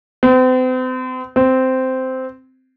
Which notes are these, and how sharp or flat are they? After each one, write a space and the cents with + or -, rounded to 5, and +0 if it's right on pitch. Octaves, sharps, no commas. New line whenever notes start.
C4 -40
C4 -10